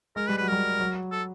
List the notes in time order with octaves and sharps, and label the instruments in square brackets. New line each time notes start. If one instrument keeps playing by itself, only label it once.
[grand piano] G#3 [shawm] A#4
[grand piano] G3 [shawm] B4
[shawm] B4
[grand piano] F#3
[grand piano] G3 [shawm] A#4
[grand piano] F#3
[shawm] A4